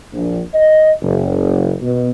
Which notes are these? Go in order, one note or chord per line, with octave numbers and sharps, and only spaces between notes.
A#1
D#5
F#1
B2